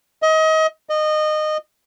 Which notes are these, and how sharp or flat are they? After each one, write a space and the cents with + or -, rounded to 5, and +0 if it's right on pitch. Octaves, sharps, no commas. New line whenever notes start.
D#5 +30
D#5 -20